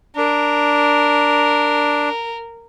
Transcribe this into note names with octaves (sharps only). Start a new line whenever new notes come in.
D4 A#4